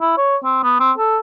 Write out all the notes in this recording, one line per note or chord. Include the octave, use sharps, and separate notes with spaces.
E4
C#5
C4
B3
C4
A4